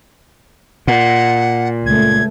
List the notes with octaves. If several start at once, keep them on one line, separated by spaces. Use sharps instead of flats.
A#2 F#5
C#2 A3 G#6